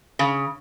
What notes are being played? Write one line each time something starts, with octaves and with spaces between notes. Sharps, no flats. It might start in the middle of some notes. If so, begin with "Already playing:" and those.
C#3